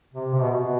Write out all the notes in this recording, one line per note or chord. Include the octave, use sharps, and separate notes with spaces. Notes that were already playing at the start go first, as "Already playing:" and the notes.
C3
C3
B2
B2